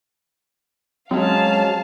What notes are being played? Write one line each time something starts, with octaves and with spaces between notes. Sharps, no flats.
F#3 G#3 C4 C#4 F5 A5